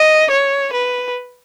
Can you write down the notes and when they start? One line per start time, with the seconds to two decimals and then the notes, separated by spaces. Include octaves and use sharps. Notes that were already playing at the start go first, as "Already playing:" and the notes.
Already playing: D#5
0.31 C#5
0.73 B4